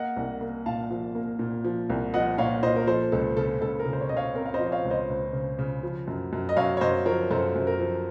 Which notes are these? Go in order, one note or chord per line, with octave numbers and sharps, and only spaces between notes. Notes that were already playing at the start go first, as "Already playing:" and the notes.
Already playing: A#3 D#5 F#5
C2
A#3
A#2 F5 A5
F3
A#3
A#2
F3
C2
F3 D#5 F#5
A#2 C#5 F5
A#2 C5 D#5
A#4
F3 A4 C5
C#2 A4
C#3 A4
C#2 A4
A#4
C#3
C5
C#5
C#3 D#5
C#5 F5
C4 A#4
F5
C5 D#5
F3
D#5
C#5 F5
C#2
C5 D#5
C#2
C#3
C#3
F3
F#2
F#2
D#5
F#2 C#5 F5
C#5
F#2 C5 D#5
F3 A#4 C#5
F#2 A4 C5
F#2
A#4
F3